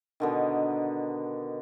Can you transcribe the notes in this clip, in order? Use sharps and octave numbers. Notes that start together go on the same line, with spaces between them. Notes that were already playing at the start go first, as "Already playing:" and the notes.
B2 D3 D#3